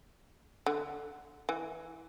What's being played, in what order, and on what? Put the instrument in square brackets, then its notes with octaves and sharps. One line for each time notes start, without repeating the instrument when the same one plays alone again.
[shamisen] D3
E3